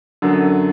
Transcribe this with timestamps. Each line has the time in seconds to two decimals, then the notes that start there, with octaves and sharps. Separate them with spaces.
0.22 F#2 D3 F#3